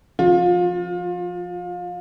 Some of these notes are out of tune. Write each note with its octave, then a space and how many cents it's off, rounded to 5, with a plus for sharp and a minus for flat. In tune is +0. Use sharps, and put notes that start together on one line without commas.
F3 +0 F4 +30